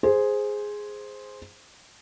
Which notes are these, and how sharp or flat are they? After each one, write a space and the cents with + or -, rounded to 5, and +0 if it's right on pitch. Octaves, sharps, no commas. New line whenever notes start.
G#4 +0 C5 +0